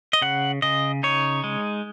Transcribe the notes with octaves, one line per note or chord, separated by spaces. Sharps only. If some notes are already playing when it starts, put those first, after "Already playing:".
D#5
C#3 F#5
C#3 D#5
D#4 C#5
G#3